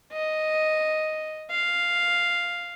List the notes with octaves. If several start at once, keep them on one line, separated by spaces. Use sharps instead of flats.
D#5
F5